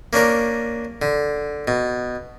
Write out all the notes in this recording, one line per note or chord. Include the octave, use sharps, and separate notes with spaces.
A#3 C#4 D4 A#4
D3
B2